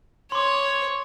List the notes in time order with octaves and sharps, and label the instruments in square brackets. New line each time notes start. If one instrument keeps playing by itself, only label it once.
[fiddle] C#5 [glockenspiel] C6 D6